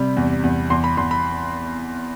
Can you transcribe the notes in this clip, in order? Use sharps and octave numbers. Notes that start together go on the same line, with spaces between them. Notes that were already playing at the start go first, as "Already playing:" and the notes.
Already playing: C3 G3 B5
E2
E2
E2 C6
B5
E2 C6
B5